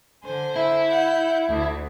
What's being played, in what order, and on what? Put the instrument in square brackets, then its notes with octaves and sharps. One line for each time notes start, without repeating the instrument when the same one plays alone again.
[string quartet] D3 C5 G#5
[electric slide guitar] E4
[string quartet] F#5 G6
D2